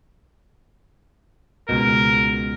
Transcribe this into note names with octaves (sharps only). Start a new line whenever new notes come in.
C#2 B2 A#4